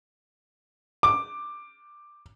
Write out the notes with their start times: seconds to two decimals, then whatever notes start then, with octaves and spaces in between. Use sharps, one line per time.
1.03 D6